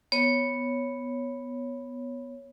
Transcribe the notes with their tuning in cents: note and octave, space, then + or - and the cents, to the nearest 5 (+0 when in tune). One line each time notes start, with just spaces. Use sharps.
B3 +0 C#5 +0